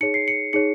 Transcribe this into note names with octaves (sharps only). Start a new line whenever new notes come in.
D#4 G#4 C#5 C#7
C7
C#7
D#4 G#4 C#5 C#7